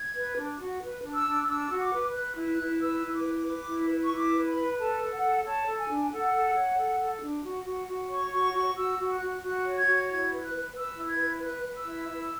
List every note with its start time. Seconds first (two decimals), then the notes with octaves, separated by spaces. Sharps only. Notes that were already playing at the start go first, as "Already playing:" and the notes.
Already playing: G#6
0.15 B4
0.37 D4
0.59 F#4
0.81 B4
1.03 D4
1.15 E6
1.26 D4
1.47 D4 E6
1.69 F#4
1.80 D6
1.92 B4
2.14 B4 F#6
2.36 E4
2.47 F#6
2.58 E4
2.80 B4 E6
3.02 E4
3.13 D6
3.24 B4
3.47 B4
3.68 E4
3.90 B4
4.03 C#6
4.12 E4 D6
4.35 B4
4.46 B5
4.57 B4
4.78 A4 A5
5.01 A4
5.11 F#5
5.23 A4
5.45 C#5 A5
5.67 A4
5.78 G#5
5.89 D4
6.11 A4 F#5
6.34 A4
6.55 C#5
6.78 A4
7.00 A4
7.22 D4
7.44 F#4
7.66 F#4
7.88 F#4
8.10 C#5 C#6
8.32 F#4 C#6
8.54 F#4 C#6
8.76 F#4 E6
8.99 F#4
9.10 F#6
9.21 F#4
9.42 F#4 F#6
9.64 C#5
9.75 G#6
9.87 F#4
10.08 E4 G#6
10.30 B4
10.42 F#6
10.53 B4
10.75 B4 E6
10.97 E4
11.08 G#6
11.18 B4
11.41 B4 F#6
11.63 B4
11.75 E6
11.85 E4
12.08 E4